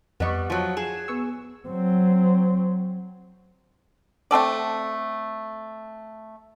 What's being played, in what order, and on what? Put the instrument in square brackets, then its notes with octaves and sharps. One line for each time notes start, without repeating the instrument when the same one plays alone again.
[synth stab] F2 D#5 C#6 [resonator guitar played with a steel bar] G3 B3
[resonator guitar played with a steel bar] F3 F#3
[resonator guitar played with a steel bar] G#4 [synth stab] E7
[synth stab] B3 C#6 E6
[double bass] F#3 C4
[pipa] A3 C4 A4 D5